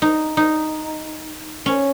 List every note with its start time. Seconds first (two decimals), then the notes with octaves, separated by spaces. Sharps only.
0.02 D#4
0.37 D#4
1.66 C#4